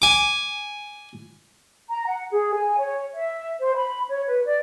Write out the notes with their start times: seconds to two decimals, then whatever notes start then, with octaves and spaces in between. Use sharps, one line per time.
0.02 G#5 D6
1.90 A#5
2.07 F#5
2.32 G#4
2.55 G#5
2.78 C#5
3.14 E5
3.61 C5
3.74 B5
4.09 C#5
4.28 B4
4.45 D5